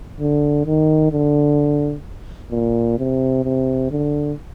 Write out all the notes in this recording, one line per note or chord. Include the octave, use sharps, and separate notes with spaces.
D3
D#3
D3
A#2
C3
C3
D3